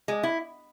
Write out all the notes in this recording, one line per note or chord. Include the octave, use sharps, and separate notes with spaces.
G#3
E4